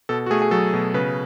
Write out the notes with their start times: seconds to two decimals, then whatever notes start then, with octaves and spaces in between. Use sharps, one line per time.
0.09 B2 A4
0.26 F#4
0.30 A3 G#4
0.42 G#4
0.51 F#3 A4
0.73 B2
0.94 C#3 B4